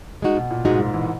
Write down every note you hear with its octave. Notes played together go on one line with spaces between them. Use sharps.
G#3 D#4 F#4
B2
A#2
G#2 G#3 D#4 F#4
G#2
E3